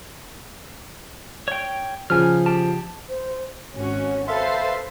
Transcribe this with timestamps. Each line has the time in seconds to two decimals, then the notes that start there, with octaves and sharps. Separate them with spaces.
1.48 C#5 G5
2.10 C#3 F3 G#5 F6
2.46 G4 A5
3.09 C5
3.75 G#1 C#4 F#4
4.28 A4 B4 C5 E5 F5 C6